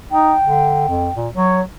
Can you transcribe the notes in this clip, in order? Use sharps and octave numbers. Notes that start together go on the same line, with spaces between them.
D#4 G5
D3
F2
A#2
F#3 C#5